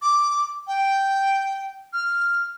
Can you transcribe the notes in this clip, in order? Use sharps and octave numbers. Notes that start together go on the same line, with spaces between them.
D6
G5
F6